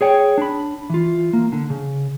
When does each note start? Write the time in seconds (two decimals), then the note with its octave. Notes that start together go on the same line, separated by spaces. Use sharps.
0.01 G#4 C#5 G5
0.38 D4 B5
0.90 E3 F4
1.33 A#3
1.52 D3
1.70 C#3